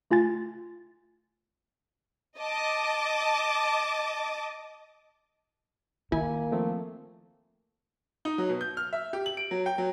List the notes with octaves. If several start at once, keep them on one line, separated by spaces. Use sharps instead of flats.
A3 F4 G#5 A6
D#5 A5 D6
D#3 A#3 E4 G#5
F3 A3 C4
D#4
F#3
B2
G6
F6
E5
G4
F#7
D7
F#3
G5
F#3